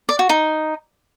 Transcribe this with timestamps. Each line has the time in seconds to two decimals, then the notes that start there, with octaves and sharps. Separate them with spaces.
0.09 D5
0.19 F#4
0.29 D#4